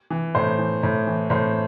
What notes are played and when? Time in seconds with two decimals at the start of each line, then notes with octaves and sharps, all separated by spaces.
0.10 E3
0.35 A2 C5
0.59 E3
0.83 A2
1.07 E3
1.30 A2 C5